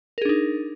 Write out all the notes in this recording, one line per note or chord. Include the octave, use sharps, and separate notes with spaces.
D4 D#4 G#4 A#4